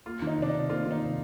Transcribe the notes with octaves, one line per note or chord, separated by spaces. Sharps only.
A#3 F4
D#3
D#4
C3 D4
D#4
C3
A#3 F4
D#3
D#4
C3